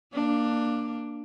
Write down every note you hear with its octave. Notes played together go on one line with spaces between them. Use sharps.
A#3 D4